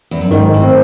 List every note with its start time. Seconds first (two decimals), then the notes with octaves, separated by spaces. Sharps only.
0.11 E2
0.21 F#2
0.31 G#2 D#3
0.46 D#3
0.54 A2
0.62 C4